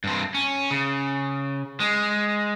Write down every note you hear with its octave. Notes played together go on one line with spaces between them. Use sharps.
G2 C4
C#4
C#3
G#3